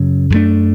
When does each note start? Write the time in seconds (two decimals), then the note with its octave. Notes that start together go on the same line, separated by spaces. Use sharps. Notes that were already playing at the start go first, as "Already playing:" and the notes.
Already playing: F#2 C#3 F#3
0.30 F#2 E3
0.34 A3 D4